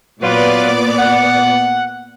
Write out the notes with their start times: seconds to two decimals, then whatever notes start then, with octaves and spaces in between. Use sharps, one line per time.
0.22 A#2 F#3 B3 F4 B4 D5
0.98 F#5